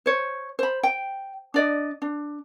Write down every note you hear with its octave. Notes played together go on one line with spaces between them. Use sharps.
C5 C#5
C5 B5
G5
D4 D5 D#5
D4